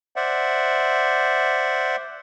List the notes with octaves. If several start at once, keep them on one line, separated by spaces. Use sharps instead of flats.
C5 D5 E5 F#5